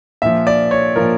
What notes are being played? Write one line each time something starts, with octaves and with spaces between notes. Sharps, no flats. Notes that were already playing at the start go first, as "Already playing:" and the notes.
A#2 F3 E5
D5
C#5
A#2 F3 A#4